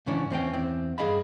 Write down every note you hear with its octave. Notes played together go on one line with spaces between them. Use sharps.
C#2 G#2 E3 C#4 D4
E2 C4 C#4 G5
E2 C4
G2 G#4 D#5 F5 B5